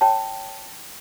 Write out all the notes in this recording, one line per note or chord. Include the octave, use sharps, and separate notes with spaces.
C#5 G5 A5